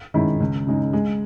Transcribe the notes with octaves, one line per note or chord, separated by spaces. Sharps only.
D#3 G#3 C#4 E4
C#2
C#3 G#3 D#4
G#3